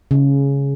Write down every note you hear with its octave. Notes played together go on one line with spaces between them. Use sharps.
C#3